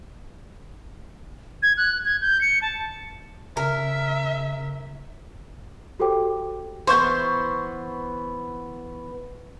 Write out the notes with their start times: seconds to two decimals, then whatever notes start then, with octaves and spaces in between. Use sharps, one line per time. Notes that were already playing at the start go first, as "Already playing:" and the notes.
1.63 G#6
1.77 F#6
2.05 G#6
2.21 G6
2.41 C#7
2.62 A5
3.57 C#3 A#4 E5
5.99 F#4 G4 A4 C5 G5 D6
6.87 E3 B3 C5 C6 C#6 G6